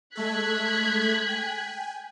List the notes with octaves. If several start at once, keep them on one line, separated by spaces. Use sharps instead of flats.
G#3 A3 A4 F#6 G#6 B6
G5 G#5